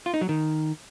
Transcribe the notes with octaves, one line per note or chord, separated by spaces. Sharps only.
F4
D#4
F#3
D#3